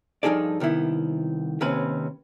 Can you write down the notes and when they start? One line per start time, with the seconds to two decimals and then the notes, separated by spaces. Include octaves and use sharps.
0.23 G2 F3 D#4 G#4 A4 D5
0.60 C2 D#3 B3 E4
1.61 D#2 C3 C4 C#4 B4 B5